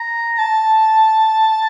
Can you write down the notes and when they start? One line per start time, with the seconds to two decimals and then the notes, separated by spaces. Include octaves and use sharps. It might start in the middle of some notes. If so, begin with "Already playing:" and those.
Already playing: A#5
0.39 A5